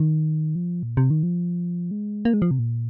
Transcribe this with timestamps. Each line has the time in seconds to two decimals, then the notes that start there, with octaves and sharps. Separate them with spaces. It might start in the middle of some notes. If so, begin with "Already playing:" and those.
Already playing: D#3
0.55 F3
0.83 A#2
0.97 C3
1.10 D#3
1.23 F3
1.91 G#3
2.25 A#3
2.34 G#3
2.42 F3
2.51 C3
2.59 A#2